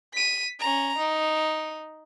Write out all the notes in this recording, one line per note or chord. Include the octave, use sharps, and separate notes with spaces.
B6 D#7
C#4 A#5
D#4